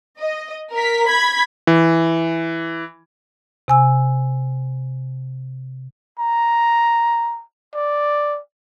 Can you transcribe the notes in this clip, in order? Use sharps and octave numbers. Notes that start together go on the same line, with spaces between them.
D#5
A#4 B6
B5 G#6 B6
E3
C3 G#5 E6
A#5
D5